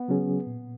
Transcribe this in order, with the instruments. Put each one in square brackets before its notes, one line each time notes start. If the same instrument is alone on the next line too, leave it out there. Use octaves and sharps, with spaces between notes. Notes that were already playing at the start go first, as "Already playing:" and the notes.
Already playing: [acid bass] B3
[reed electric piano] C#3 F#3 C#4 G#4
A#2